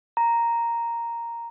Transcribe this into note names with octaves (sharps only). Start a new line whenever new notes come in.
A#5